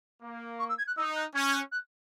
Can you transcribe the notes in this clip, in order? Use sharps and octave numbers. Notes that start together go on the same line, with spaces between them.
A#3
C#6
E6
G#6
F#6
D#4 E6
F#6
C#4 G#6
G#6
F#6
F#6